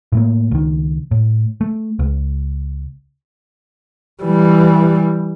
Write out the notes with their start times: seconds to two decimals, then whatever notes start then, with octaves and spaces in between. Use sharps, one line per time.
0.12 A2 A3 A#3
0.51 C#2 D#3
1.11 A2
1.61 A3
1.99 C#2
4.23 E3 G3